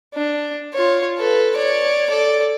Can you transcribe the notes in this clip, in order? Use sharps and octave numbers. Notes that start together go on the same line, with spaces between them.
D4
F4 C#5
A4 B4
C#5 D5
A4 D5